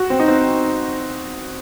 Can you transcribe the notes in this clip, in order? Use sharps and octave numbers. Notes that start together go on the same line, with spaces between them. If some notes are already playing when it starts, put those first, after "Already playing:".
Already playing: F#4
C4
D#4
C4